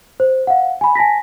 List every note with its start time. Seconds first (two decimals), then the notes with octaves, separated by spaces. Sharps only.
0.20 C5
0.47 F5 F#5
0.81 G#5 B5
0.95 G#5 A5 A#6 B6